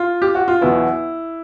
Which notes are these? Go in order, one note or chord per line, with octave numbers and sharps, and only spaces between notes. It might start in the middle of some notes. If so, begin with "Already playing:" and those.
Already playing: F4
G4
F#4
F4
E2 B2 F#3 B3 E4